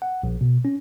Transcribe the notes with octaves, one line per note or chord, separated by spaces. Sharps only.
F#5
A#1
B2
C#4